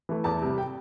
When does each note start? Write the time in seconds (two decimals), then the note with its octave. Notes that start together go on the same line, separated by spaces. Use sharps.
0.09 E3 A3
0.24 E2 A5
0.42 C3 G3
0.58 G5